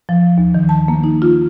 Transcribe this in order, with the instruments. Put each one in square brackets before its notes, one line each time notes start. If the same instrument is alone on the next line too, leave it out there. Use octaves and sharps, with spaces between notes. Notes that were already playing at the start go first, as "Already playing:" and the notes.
[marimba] F3
D#2
D#3
A5
A#3
D#4
F4